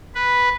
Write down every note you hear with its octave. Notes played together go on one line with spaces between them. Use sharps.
B4